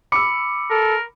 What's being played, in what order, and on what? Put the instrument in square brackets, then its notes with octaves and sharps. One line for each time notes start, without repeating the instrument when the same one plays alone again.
[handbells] B5 C#7 [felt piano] D6 E6
[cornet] A4 [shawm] A#4